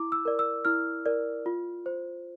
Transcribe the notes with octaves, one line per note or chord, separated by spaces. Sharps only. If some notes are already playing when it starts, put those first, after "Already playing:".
Already playing: E4 D6
E6
A#4 D5
E6
E4 F6
A#4 D5
F4
C5